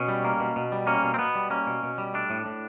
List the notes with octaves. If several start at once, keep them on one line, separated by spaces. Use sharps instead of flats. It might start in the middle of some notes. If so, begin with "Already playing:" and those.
Already playing: B2 C#4
G3
A#3
B2
B2
G3
A#3 C#4
B2
C4
B2 B3
G3
A#3 C#4
B2
B2
G3
A3 D4
A2
A2